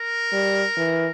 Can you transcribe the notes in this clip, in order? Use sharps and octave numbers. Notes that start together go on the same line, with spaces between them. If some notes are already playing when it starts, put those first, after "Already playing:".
Already playing: A#4
G3
E3